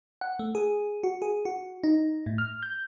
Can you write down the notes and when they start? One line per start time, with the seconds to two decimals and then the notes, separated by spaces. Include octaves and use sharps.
0.21 F#5
0.39 A3
0.55 G#4
1.03 F#4
1.22 G#4
1.45 F#4
1.83 D#4
2.26 A2
2.38 F6
2.63 G6